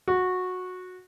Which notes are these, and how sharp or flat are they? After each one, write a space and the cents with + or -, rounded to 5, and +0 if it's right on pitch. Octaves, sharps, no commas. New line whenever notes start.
F#4 -15